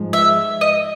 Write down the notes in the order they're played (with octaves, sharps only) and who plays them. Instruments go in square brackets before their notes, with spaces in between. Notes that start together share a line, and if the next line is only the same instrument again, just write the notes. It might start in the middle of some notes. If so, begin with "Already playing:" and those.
Already playing: [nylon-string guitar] G#2 F3 G#3
[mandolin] E5
D#5